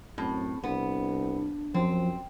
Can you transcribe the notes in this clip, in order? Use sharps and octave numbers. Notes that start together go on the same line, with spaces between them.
F#2 A2 C4
C2 B3 D4
F#2 F3 C4